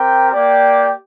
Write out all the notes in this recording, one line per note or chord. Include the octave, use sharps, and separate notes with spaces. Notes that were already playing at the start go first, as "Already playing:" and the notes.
Already playing: C4 G4 A#4 G5
A#3 G4 D5 G5